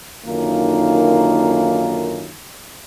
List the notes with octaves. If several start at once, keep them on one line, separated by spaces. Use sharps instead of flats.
F#2 D3 D#3 A#3 D#4 F4